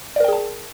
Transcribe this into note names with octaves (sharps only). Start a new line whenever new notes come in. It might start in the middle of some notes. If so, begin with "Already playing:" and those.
G#4 A#4 D5 G5 A5